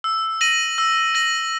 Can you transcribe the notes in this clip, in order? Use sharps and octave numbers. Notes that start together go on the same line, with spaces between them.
E6
A#6 D#7 F#7
E6
A#6 D#7 F#7